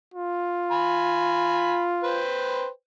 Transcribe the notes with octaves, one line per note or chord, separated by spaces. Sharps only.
F4
G#5 B5
B4 C5 G5